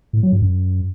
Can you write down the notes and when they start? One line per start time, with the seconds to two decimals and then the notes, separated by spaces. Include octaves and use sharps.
0.13 A2
0.23 F#3
0.32 G2
0.42 F#2